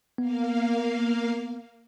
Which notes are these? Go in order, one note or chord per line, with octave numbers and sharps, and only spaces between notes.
A#3 B3 F5